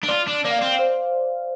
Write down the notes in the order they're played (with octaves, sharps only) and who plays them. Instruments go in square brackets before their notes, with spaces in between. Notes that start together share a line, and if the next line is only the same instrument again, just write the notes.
[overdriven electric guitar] D4
[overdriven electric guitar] F4 [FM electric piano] D5
[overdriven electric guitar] D4
[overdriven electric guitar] A#3 [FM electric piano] D5
[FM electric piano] F5
[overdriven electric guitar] C4 [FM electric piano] D5
[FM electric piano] C5